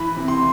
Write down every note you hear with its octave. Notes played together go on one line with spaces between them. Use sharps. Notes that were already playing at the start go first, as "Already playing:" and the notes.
Already playing: E3 B5
C3
C6